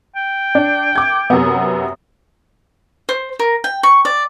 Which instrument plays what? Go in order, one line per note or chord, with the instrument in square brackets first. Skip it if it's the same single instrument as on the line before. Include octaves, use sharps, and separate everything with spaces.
[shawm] G5
[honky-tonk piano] D4
D6 G#6
F#2 C3 B3
[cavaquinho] C5
A#4
G5
C#6
D5